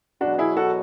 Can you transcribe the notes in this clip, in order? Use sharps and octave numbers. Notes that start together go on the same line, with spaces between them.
E2 B2 F#3 D4 F#4
E4 G#4
F#4 A4